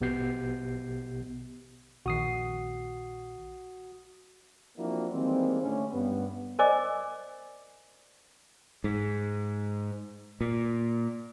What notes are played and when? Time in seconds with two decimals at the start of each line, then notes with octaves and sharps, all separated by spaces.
0.01 A#1 B2 B3 G4 G6 C7
2.06 A#1 D#3 F#4 D#6 C7
4.78 F3 A#3 C4 D4 E4 F#4
5.12 D#3 E3 G3 G#3 A#3 C4
5.62 A2 D3 C#4
5.93 G2 B3
6.59 A#4 C5 D5 D#5 G#5 D6
8.84 G#2
10.41 A#2